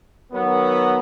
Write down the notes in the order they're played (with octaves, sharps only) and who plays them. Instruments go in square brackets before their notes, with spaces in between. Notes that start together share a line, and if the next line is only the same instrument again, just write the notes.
[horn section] D#3 F#3 B3